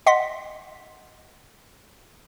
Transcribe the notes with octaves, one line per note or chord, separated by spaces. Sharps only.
D#5 F#5 C6 B6